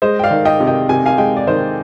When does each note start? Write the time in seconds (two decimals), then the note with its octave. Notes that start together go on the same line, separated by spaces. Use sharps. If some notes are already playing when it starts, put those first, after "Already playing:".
0.02 G#3 C5 D#5
0.19 G5
0.23 D5 F5
0.31 D#3
0.45 D#5 G5
0.60 C3
0.67 D#5 G5
0.89 C3 G#5
1.06 F5 G#5
1.18 G#3 D#5 G5
1.37 D5
1.47 D#3 C5 D#5